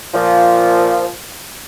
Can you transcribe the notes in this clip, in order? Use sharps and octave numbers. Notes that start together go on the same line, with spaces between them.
A#2 F3